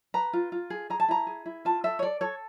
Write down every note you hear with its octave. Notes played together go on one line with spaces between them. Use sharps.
B4 A#5
F4
F4
G#4
G#4 A#5
A5
E4 A#5
G#4
E4
F4 A5
A4 E5
C#5
A4 D5
A4 C#5